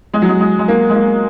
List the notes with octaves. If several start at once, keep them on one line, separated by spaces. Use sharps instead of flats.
G#3
F#3
G#3
G#3
G#3
A#3
G#3
A#3